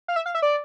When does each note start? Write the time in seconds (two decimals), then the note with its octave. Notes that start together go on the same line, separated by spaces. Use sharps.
0.08 F5
0.16 E5
0.26 F5
0.35 E5
0.42 D5